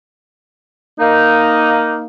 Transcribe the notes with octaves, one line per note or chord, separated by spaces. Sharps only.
A#3 D#4